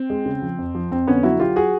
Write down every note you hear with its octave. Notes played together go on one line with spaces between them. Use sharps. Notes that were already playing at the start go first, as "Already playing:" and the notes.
Already playing: C4
G#3
C#3
F3
F2
F3
F2 C4
D3 B3 C#4
F#3 E4 F#4
F#3 F4 G4
F#4 G#4